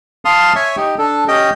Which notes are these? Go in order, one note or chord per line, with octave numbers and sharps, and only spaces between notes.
F5 A5 C6 D#6 F6
C#5 E5 G#5 C#6
D#4 G4
D4 A4
C#4 G4 D#5 G5